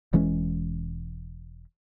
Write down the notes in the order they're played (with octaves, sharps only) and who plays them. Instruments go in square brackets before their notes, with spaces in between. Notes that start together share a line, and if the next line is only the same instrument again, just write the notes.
[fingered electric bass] E1 E3 G#3 C#4